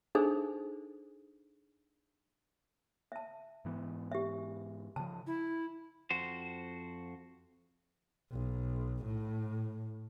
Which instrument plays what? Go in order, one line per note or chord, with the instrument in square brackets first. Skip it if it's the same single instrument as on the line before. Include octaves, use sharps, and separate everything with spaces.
[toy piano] D4 D#4 G#4 A4 C5
E5 A5
[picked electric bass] G#2 E3 B3
[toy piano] G4 E5
[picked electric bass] C#3 F3 [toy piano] A5
[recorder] E4
[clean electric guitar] F2 F#4 C5
[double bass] B1
A2